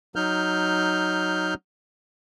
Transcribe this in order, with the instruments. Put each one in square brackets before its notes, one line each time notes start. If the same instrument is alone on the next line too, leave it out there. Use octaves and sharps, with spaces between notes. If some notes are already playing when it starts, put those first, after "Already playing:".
[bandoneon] F#3 D#4 F6 G6